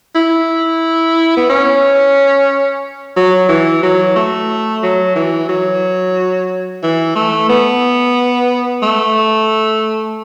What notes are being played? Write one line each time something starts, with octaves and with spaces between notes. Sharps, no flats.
E4
B3
C#4
F#3
E3
F#3
A3
F#3
E3
F#3
E3
A3
B3
A3